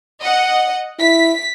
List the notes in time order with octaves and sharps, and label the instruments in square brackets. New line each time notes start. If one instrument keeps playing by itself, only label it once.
[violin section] D#5 F#5
[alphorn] E4 [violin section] B6